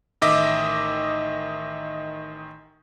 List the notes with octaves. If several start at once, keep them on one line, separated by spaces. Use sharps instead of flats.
A1 D#3 D#5 E5 D6